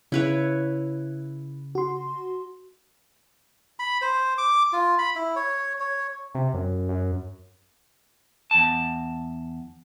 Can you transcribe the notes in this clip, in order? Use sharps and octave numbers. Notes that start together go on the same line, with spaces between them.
C#3 E4 B4 C#5
F#4 C6
B5
C5
D6
F4
B5
E4
C#5
C#5
C3
F#2
F#2
E2 A5